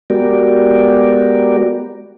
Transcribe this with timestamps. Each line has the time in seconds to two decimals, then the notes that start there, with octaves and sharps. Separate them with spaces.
0.10 G#3 B3 F#4 G4 A#4 D5